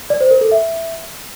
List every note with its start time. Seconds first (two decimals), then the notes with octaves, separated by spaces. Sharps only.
0.10 D5
0.21 C5
0.31 A#4
0.41 A4
0.51 E5